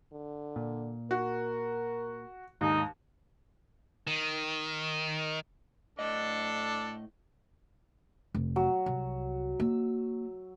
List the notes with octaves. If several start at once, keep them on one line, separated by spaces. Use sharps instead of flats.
D3
A#2
F#4 A#4
D#2 G#2 D3 D#4
D#3
A2 D4 A4 D#5
F1
F#3
C2
A#3 E6